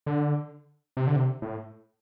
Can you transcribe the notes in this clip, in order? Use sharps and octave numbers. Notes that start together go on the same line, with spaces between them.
D3
C3
D3
C3
A2